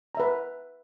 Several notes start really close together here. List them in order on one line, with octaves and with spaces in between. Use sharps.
A#5 E5 B4